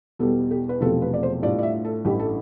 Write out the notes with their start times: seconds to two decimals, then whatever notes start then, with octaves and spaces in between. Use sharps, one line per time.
0.19 E2 B2 G3 B3 A4
0.51 G4
0.69 B4
0.81 E1 E2 C3 F3 A3 A4
1.02 B4
1.14 D5
1.23 C5
1.42 A2 G3 D4 F4 D5
1.59 D5
1.63 E5
1.85 A4
2.05 A1 G2 E3 A3 E4 G4
2.19 A4